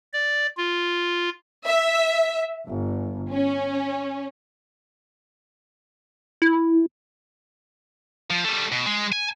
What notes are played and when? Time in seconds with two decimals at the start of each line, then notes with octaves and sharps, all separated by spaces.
0.13 D5
0.57 F4
1.67 E5
2.68 G1
3.31 C#4
6.42 E4
8.30 F3
8.44 G3 A3
8.72 B2
8.86 G#3
9.13 G#5